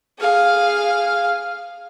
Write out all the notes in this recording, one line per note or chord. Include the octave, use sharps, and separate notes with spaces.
G#4 F5